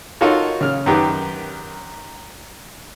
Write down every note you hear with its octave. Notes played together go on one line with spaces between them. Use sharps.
D#4 F4 F#4 A4 A#4 C#5
C#3 F6
F#2 D#3 G4 B4